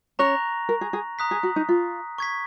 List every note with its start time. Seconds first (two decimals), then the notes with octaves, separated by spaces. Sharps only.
0.19 C#4 C#5 A#5 C#6 F#6 A#6 F7
0.69 A#4
0.81 G#4
0.93 G#4
1.19 A#5 D#6 F#6 B6
1.31 G#4
1.43 F#4
1.56 D#4
1.69 F4
2.18 C#6 G#6 B6